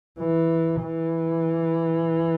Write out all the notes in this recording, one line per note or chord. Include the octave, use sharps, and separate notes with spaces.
E3
E3